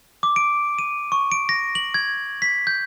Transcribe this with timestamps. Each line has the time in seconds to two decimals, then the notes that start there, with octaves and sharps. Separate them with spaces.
0.23 D6
0.36 D7
0.79 D#7
1.12 C#6
1.32 D7
1.49 A#6
1.75 F#7
1.94 G#6
2.42 B6
2.67 G6